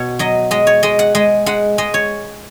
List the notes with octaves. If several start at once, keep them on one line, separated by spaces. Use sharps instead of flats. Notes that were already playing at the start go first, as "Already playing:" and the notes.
Already playing: B2 C#5
F#3 D#5
G#3 D#5
C#5
G#3 D#5
F#5
G#3 D#5
G#3 F#5
G#3 D#5
C#5